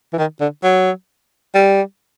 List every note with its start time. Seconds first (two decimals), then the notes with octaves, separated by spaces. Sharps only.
0.13 E3
0.18 D#3
0.41 D3
0.64 F#3
1.55 G3